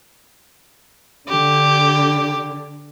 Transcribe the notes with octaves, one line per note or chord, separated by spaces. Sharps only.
D3 G4